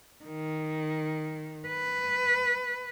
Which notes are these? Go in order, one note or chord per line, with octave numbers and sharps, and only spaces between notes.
D#3
B4